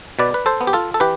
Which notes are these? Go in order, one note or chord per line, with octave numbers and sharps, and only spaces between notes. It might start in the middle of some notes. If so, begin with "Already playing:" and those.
B2 B4 D5
B4
A4 C5
B3
G4
F4 A4
A4
E3 G4 B4